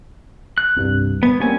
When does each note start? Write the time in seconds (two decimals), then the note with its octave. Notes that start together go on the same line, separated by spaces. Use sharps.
0.58 F#6
0.77 C2 G2
1.23 B3 G#6
1.40 G3 A#3 C4 C#4 G#5